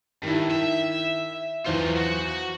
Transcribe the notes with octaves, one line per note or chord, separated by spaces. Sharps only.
G2 D#3 E4
E5
E2 F#3 F4 C5
F#4